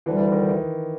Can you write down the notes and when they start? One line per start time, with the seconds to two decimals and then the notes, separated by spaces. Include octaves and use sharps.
0.06 D2 D3 E3 G3
0.19 E3
0.32 D#3
0.49 E3